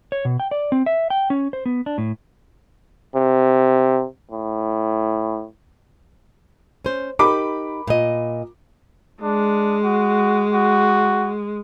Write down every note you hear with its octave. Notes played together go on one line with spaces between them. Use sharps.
C#5
B2
G5
D5
C4
E5
G5
C#4
C5
B3
D4
A2
C3
A2
C#4 C5
D#4 G4 A#4 B5 D6
A#2 D#5
G#3 D4
F#4
F#4